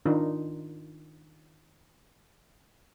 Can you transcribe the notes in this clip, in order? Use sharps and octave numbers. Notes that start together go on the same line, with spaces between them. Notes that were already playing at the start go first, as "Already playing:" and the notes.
D#3 D4 D#4 F4